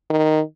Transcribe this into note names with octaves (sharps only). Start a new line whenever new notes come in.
D#3